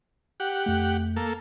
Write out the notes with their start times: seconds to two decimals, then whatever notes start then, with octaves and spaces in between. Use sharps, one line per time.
0.40 G4 F#5
0.66 F2 A3
1.16 A#3 A4